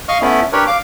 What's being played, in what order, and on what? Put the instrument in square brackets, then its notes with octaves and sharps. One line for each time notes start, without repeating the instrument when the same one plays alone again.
[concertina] D#5 F5 C#6 F6
A3 B3 C#4 E4
D4 G4 A#4 B4 C#5
F5 D6